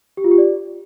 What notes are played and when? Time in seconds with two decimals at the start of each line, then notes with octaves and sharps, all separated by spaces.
0.17 G4
0.24 F4
0.31 G4
0.38 D5